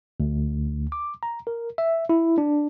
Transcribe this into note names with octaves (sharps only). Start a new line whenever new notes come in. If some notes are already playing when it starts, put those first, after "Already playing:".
D2
D6
A#5
A#4
E5
E4
D4